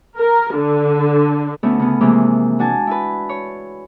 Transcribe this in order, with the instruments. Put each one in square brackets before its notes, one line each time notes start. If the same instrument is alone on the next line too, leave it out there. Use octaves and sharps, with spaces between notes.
[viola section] A#4
D3
[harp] D2 A3 B3 C#4 E4
C#3 B3
C3 E3 F3 G#3 A#3
D4 F#4 G#5 A5
E4 B4
C#5